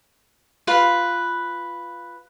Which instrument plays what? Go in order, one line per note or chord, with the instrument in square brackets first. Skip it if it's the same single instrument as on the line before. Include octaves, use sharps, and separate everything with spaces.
[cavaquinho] F4 B4 B5